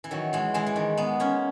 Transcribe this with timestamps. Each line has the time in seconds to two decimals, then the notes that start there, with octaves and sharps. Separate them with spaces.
0.04 E3
0.11 D#3 F#3
0.33 E3 G#3
0.54 E3 G#3
0.66 E3
0.76 D#3
0.97 G#3 B3
1.20 A#3 C#4